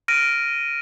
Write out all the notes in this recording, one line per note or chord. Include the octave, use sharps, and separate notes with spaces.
F6 A#6 D7 D#7